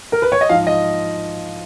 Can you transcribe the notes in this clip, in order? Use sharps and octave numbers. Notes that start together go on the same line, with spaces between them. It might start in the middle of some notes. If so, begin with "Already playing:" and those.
A#4
B4
C#5
D#5
G#2 F3 F5
D#5